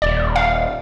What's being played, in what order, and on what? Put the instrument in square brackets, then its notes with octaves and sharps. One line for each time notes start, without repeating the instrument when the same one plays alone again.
[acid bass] D#1 [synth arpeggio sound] D5
[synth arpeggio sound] F5